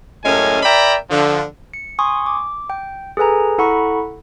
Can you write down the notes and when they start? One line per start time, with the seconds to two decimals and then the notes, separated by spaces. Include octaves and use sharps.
0.24 F#2 A2 G#3 C#4 A4 G#5
0.63 A#4 D5 E5 G5 A#5 B5
1.11 D3 F3
1.74 C#7
1.99 G#5 C6 C#6 D#6
2.26 D6
2.70 G5
3.17 G#4 A4 B4 G#5 A#5
3.58 E4 A4 F#5 A#5 B5 C#6